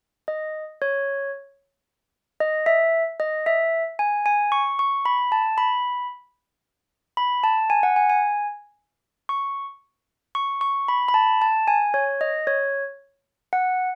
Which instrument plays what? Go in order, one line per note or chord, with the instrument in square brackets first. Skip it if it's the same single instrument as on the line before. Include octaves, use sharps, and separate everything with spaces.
[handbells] D#5
C#5
D#5
E5
D#5
E5
G#5
G#5
C#6
C#6
B5
A5
B5
B5
A5
G#5
F#5
G#5
G#5
C#6
C#6
C#6
B5
B5
A5
A5
G#5
C#5
D#5
C#5
F#5